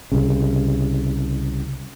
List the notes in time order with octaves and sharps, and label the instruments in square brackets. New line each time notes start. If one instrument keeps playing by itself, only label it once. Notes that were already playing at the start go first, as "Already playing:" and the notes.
[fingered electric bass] C2 C#3